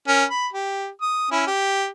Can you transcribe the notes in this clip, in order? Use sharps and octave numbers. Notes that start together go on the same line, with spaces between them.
C#4 A#4
B5
G4
D#6
C#4 E4
G4